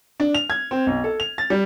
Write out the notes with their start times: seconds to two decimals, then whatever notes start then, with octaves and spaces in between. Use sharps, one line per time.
0.20 D4
0.35 F7
0.50 G#6
0.71 C4
0.87 B1
1.04 A4
1.20 F7
1.38 A6
1.50 G3